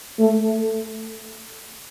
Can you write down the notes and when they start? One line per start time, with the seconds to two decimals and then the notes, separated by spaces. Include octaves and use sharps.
0.19 A3